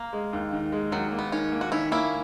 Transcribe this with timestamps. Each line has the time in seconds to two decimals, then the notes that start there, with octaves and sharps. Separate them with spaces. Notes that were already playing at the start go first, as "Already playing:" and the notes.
Already playing: A#3
0.13 G#3
0.33 D#2
0.53 D#3
0.72 G#3
0.92 D#2 F#3
1.12 A#3
1.19 B3
1.32 D#3 C#4
1.52 A#3
1.61 F#4
1.72 D#3 C#4 E4
1.91 A#3 C#4 E4